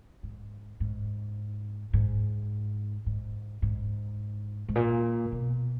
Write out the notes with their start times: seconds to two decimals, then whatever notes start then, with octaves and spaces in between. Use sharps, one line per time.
0.23 G#2
0.80 G#2
1.93 G#2
3.06 G#2
3.62 G#2
4.69 G#2
4.75 A#2
5.32 B2